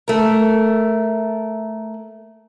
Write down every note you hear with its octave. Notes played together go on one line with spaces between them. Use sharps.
A3 A#4